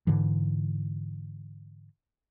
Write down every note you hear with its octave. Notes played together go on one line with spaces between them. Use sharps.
G#2 D3 E3